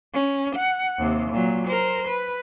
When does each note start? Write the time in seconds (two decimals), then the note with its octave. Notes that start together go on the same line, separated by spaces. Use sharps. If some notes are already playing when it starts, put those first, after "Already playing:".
0.14 C#4
0.56 F#5
0.98 D#2 C3
1.32 A#2 F#3
1.67 A#4 C5
2.07 B4